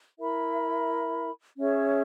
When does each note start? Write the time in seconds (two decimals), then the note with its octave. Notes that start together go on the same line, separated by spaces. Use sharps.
0.20 E4 A#4 E5 B5
1.58 C#4 G#4 C#5 E5